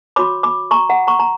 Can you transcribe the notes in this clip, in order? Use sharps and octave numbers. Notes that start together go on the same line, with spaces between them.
F#4 C#5 B5 D6
B5 D6
A#5 C#6
F#5 A#5
A#5 C#6
A#5